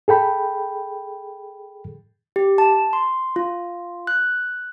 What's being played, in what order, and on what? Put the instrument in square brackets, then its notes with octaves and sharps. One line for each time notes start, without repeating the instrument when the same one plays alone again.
[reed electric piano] G#4 A4 G5 B5
[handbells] G4
A5
C6
F4
F#6